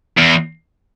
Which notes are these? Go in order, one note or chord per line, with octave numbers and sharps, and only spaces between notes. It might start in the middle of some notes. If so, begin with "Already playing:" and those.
E2